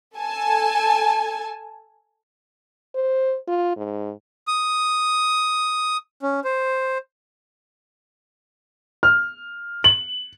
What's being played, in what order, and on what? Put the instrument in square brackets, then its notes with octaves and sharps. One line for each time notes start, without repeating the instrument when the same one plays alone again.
[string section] A4 G#5 A5
[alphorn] C5
F4
G#2
[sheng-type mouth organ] D#6
C#4
C5
[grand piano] F6
F#7